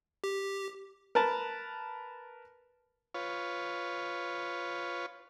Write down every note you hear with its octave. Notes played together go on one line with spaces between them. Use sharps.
G4
A#4 B4 A5
F4 B4 C#5